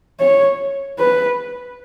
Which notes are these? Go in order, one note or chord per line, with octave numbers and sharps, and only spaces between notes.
C#5
B4